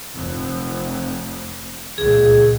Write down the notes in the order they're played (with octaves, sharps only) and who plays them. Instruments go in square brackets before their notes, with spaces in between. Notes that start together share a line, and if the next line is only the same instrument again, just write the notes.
[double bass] F1 F2
[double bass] C#2 A#2 [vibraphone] G#4